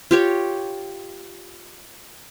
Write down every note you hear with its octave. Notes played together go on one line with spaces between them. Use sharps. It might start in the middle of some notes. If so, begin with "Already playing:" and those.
F4 G4 C#5